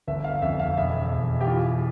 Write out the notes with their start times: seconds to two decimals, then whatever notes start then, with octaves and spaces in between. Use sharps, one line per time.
0.07 G1 E5
0.24 F5
0.42 F2 E5
0.60 F5
0.77 E1 E5
1.12 E1
1.41 G4
1.46 E3 F4